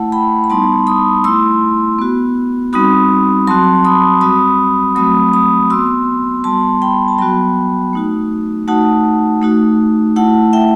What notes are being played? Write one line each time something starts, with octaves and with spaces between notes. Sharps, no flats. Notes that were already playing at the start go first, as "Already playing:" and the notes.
Already playing: A3 E4 F#5 A5
G5 B5
B5
G3 B3 D#4 A5 C6
B5 D#6
A3 E4 C6 E6
B3 F#4
G3 C4 D#4 F#4 B5 D#6
F#3 C4 F#4 A5 C6
B5 D#6
G3 C4 F#4 B5 D#6
F#3 A3 C4 F#4 B5 D#6
B5 D#6
B3 F#4 C6 E6
G3 B3 F#4 A5 C6
G5 B5
A5
F#3 B3 F#4 G5 B5
A3 D#4 F#4
A3 D#4 F#4 F#5 A5
A3 D#4 F#4
A3 E4 F#5 A5
E5 G5